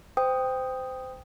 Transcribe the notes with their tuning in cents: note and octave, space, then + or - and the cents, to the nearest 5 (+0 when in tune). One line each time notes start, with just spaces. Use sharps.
C5 -25 G5 +5 D#6 +0